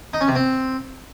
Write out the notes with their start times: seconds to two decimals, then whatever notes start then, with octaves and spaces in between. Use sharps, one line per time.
0.14 D#4
0.21 C#4
0.28 C3
0.35 C4